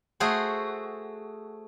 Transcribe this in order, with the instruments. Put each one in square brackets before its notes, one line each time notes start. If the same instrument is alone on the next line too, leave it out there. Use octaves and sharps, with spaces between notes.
[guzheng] A3 F#4 G#4 C5